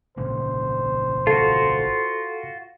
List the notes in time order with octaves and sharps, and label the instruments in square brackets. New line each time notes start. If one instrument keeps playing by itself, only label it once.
[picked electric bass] G#1 A#2 C#3 [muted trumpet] C5
[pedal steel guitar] F4 F#4 [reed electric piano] A4